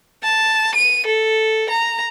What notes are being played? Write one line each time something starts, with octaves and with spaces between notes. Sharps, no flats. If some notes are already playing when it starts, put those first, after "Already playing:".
A5
D#7
A4
A#5